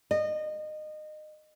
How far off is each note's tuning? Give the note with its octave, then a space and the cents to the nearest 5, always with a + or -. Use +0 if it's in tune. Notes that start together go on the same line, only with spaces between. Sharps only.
D#5 -25